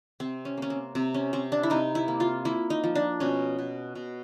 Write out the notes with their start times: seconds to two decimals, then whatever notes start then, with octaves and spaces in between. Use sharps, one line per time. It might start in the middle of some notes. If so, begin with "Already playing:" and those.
0.20 C3 C4
0.45 C#4
0.57 A#3 C#4
0.70 C4
0.95 C3 C4
1.14 C#4
1.33 C3 C4
1.52 D4
1.63 E4
1.70 C3 D#4
1.95 E4
2.08 A#3
2.20 F4
2.45 A#3 E4
2.70 D#4
2.84 F3
2.95 D4
3.20 B2 C#4
3.59 B2
3.95 B2